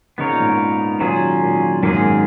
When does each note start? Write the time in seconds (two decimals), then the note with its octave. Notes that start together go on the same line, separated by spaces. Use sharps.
0.18 C#3 B3 D#4 A#4 C#5
0.29 A#2
0.40 G#2
0.50 A#2
1.00 A#2 D#3 F#3 C#4 F4 G#4
1.42 A#2
1.83 F#2 D#3 A#3 C#4 G#4
1.94 G#2